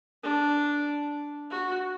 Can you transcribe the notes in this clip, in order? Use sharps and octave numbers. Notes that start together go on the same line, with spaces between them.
D4
F#4